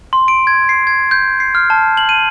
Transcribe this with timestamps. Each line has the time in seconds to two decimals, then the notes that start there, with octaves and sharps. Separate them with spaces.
0.13 C6
0.28 D7
0.47 G#6
0.69 C7
0.87 G#6
1.11 G6
1.40 C7
1.55 F6
1.70 A5
1.97 F#7
2.09 D#7